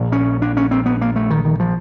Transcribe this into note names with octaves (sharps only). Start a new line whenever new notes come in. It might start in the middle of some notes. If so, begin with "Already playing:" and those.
Already playing: A#1 A#2
C#4
D4
C#4
C4
B3
A#3
A3
D#3
D#3
F3